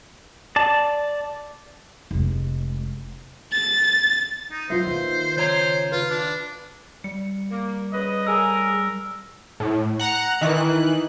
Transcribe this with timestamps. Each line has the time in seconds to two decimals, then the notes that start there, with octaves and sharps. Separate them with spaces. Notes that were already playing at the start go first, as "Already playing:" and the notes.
0.56 D5 A5
2.11 F1 G#3
3.52 A6
4.51 D#4
4.70 B1 F4 B4 C5 E5
4.87 D#2 D#3 F4
5.37 C#3 C5 C#5 A#5
5.92 F4 B4
6.10 D4
7.04 G3 C#7
7.50 A#3
7.93 C#3 B4 D#5
8.27 A2 G#4 A#4 E6
9.60 A2
9.99 F#5 A#5 F#6
10.41 D#3 E3 F#6